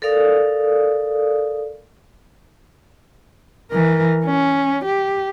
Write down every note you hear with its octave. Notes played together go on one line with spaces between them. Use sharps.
A4 A#4 D5 F5 D#6
E3 A#4
C#4
G4